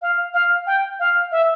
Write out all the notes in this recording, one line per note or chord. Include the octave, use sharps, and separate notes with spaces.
F5
F5
G5
F5
E5